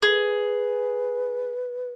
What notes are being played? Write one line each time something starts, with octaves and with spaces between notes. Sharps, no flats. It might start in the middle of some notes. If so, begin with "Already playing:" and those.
G#4 B4